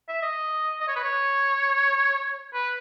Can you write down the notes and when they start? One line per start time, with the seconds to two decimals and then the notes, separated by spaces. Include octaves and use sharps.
0.08 E5
0.22 D#5
0.80 D#5
0.88 C#5
0.96 B4
1.04 C#5
2.54 B4